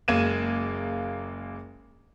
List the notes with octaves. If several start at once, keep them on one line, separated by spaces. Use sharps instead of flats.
F#1 G#3 A#3 G#6 D#7 E7